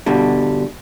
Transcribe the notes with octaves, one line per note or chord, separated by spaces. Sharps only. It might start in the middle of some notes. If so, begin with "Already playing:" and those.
G2 B2 D3 G3